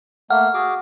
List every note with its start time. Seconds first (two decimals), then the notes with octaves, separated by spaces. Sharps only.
0.30 A3 A#3 F#5 F6
0.54 F#4 G#4 D6